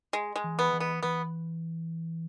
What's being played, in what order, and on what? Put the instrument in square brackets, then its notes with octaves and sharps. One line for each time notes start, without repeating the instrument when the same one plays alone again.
[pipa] G#3
G#3
[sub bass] E3
[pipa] B3
[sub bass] E3
[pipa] B3
[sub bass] E3 [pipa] B3